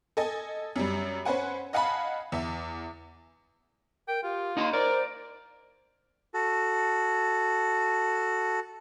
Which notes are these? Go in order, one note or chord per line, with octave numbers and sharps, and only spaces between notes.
A4 D#5 G#5
F#2 G3
C#4 B4 C5 F#5 G#5
D#5 F5 F#5 G#5 A5 B5
E2 E5
A#4 G5
F4 G4
D#4 D#5 F5 C6
A#4 C5 D5
F#4 A4